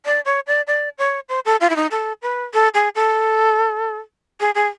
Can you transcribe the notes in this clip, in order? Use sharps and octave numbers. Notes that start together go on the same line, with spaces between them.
D5
C#5
D5
D5
C#5
C5
A4
F4
E4
D#4
A4
B4
A4
G#4
A4
G#4
G#4